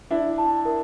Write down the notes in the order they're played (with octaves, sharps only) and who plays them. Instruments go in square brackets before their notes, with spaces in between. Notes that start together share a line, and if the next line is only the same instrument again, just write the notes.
[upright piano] D4 E4 [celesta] E5
[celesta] A5
A#4